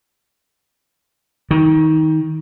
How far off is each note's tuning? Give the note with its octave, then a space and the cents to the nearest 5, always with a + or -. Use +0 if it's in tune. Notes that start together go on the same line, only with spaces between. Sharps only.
D#3 +20